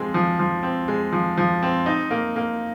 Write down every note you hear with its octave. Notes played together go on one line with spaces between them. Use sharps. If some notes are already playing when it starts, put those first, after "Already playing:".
Already playing: F3 G#3 C4
F3
F3
C4
G#3
F3
F3
C4
D#4
A#3
A#3